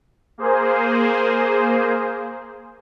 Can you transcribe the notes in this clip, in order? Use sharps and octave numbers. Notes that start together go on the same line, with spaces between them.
A#3 G#4 C5